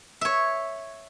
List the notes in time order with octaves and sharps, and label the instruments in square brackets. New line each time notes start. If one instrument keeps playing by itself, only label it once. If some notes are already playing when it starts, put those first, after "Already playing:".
[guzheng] C#5 E5